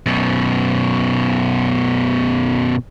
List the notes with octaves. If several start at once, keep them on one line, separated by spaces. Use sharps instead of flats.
F#2 B2